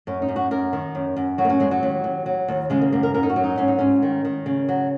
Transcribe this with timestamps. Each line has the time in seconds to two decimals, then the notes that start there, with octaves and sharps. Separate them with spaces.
0.07 F#2 C#4
0.22 D#4
0.28 F#2
0.36 F#4
0.51 F#2 A#4
0.73 D#3
0.95 F#2
1.16 F#2
1.38 F#3 F#4
1.45 A#3
1.50 C#4
1.60 F#2 G#3
1.71 F#3
1.83 D#2
2.04 D#2
2.26 F#3
2.48 D#2
2.70 C#3 G#3
2.81 A#3
2.92 F#2 A#3
3.03 A#4
3.14 F#2 A#4
3.23 D#4
3.30 F#4
3.36 F#3
3.44 D#4
3.58 G#2 C#4
3.68 D#4
3.78 G#2 C#4
4.02 D#3
4.25 D#3
4.46 C#3
4.69 F#3